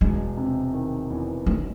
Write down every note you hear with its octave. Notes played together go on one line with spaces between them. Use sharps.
E1 G#3
C3
D#3
E2
B1 A3